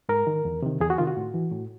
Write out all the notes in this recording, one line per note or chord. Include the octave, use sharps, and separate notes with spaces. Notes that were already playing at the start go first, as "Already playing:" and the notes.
G#2 A#4
D#3
E2
C3 D#3
E2 G#4
F#4
C3 D#3 F4
F#4
A2
E3
A2